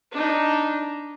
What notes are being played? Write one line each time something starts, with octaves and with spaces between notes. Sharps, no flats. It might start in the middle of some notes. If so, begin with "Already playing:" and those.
D4 D#4